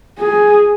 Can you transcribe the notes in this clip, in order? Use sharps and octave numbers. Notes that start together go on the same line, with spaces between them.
G#4